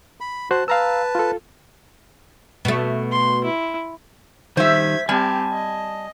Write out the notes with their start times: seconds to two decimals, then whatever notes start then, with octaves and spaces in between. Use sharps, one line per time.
0.21 B5
0.51 F#4 C5 A5 F#6
0.68 B4 F5 A5 A#5 E6
1.15 F4 A4
2.65 B2 A3
3.12 C6
3.44 E4
4.57 D#3 G3 C5 E5 G#6 B6
5.09 G3 C4 G4 G#5 A5
5.53 D#5